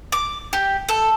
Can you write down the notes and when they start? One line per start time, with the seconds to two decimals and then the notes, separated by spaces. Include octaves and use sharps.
0.12 D6
0.53 G4
0.89 A4